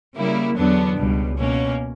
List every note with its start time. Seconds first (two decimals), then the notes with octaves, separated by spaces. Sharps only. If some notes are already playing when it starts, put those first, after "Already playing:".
0.16 C#3 G3 A#3 E4
0.57 E2 D3 F#3 B3 D4
0.98 C#2 B2 G3
1.38 B2 A#3 C#4